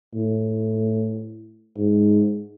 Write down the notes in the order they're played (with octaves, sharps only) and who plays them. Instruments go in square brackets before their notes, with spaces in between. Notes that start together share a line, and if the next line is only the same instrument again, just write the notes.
[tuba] A2
G#2